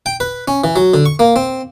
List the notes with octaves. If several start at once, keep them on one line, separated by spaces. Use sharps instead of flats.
G5
B4
C#4
E3
F#3
D3
C#6
A#3
C4